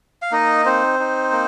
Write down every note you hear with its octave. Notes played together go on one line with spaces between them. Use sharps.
F5
A#3 D#4 D#5
C4 D#4 C5
D#4
A#3